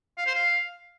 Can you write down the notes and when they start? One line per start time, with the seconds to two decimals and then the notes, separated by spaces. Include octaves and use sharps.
0.18 F5
0.26 C5
0.35 F5